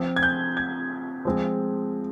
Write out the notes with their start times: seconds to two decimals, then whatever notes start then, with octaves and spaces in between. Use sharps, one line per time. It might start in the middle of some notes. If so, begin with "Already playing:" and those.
Already playing: F3 C4
0.16 G#6
0.23 G6
0.57 G#6
1.25 F3 G#3 C4